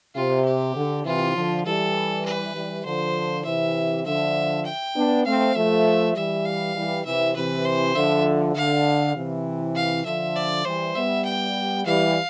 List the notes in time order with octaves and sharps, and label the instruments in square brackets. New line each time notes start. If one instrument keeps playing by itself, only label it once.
[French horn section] C3 [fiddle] F4
[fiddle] G4
[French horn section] D3
[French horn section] C3 E3 [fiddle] F4
[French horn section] D3 F3
[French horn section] E3 G3 [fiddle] A4
[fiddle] B4
[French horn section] E3 G3
[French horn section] D3 F3 [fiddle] C5
[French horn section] C3 E3 [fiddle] E5
[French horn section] D3 F3 [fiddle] E5
[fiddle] G5
[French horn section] B3 D4
[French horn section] A3 C4 [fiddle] F5
[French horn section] F3 A3 [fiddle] E5
[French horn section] E3 G3 [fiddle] E5
[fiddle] F5
[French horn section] E3 G3
[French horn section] C3 E3 [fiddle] E5
[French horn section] C3 E3 [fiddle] B4
[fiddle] C5
[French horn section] D3 F3 [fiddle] E5
[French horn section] D3 [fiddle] F5
[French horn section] C3 E3
[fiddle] F5
[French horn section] D3 F3 [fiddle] E5
[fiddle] D5
[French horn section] E3 G3 [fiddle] C5
[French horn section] G3 B3 [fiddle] E5
[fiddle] G5
[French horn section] E3 G3 [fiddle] F5